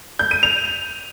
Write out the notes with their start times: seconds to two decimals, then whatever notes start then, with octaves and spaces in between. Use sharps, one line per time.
0.19 G6
0.31 D#7
0.43 F7